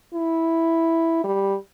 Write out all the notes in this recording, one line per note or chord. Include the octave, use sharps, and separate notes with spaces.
E4
G3